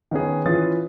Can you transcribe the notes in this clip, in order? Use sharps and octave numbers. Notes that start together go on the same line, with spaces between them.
D#3 B3 C#4 G#4
E3 C#4 F4 B4 D#6 A6